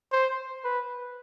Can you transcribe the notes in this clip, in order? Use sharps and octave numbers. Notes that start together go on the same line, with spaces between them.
C5
B4